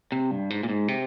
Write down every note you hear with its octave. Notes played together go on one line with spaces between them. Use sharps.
C3
G2
G#2
A#2
G#2
C3